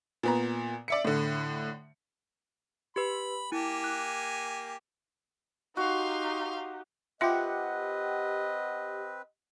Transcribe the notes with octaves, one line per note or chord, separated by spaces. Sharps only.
A#2 B3 A#5
D5 E5 C#7
A2 D3
G4 B4 B5
A#3 E4 G4 G#5
F#6
D#4 F#4 G4 F5 C6
C4 F4 G4 B4 D#5 E5 F#5